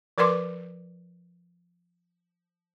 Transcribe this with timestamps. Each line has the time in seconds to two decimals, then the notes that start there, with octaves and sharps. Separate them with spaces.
0.18 F3 A#4 B4 D5 C6 D6